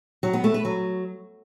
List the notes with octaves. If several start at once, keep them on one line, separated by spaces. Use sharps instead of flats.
F#3
B3
A3
B4
F#3